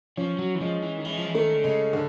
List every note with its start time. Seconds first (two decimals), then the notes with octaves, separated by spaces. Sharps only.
0.17 F3 C#4
0.39 F#3
0.55 E3
0.61 F3 G#3
0.83 E3
0.98 D#3
1.05 E3 G#3
1.17 F3
1.25 E3
1.34 D#3 A3
1.54 D3
1.64 C#3 G#3
1.93 D3